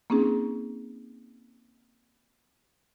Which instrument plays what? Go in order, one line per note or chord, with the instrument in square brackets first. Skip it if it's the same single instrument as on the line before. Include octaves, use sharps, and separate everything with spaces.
[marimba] A#3 C4 C#4 D#4 G#4